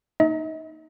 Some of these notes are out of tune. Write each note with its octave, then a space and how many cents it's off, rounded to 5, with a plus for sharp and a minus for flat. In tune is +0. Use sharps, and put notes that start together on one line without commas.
A#3 +0 D#4 +0 D#5 +45